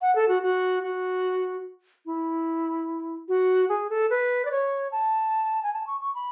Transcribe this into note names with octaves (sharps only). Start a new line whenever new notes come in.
F#5
A4
F#4
F#4
F#4
E4
F#4
G#4
A4
B4
D5
C#5
A5
G#5
A5
C#6
C#6
B5